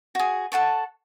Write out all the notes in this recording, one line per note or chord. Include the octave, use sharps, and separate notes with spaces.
F#4 G#4
A4 F#5 A5 C#6